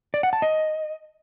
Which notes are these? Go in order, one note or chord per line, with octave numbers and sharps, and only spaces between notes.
D5
F#5
A5
D#5